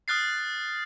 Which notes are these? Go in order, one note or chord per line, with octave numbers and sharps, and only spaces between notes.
D#6 F6 F#6 A6 C7